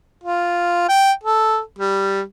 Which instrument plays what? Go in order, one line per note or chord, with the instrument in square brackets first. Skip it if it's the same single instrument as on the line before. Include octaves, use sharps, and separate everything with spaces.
[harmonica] F4
G5
A4
G3